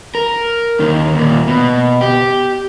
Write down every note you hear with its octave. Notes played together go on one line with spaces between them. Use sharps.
A#4
D#2 D#3
D#2 A#2
B2
G4